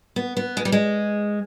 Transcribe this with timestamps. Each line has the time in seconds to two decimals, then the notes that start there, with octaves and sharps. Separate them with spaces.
0.16 B3
0.37 B3
0.57 G#3
0.65 G3
0.72 G#3